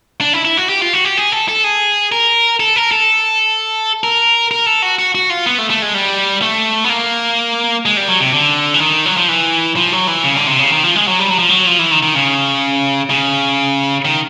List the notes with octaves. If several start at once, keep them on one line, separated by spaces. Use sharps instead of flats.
D4
E4
E4
F#4
G4
F4
F#4
G4
G#4
A4
A4
G#4
A#4
A4
A#4
A4
A#4
A#4
A4
F#4
F#4
F#4
F4
B3
A3
A3
G#3
G3
A3
B3
A#3
G#3
G3
F#3
C3
D3
E3
D#3
F#3
F3
E3
F3
F#3
E3
C#3
D3
C3
C#3
D#3
F3
G#3
F#3
G3
F#3
F3
F#3
F3
E3
D#3
D#3
C#3
C#3
D#3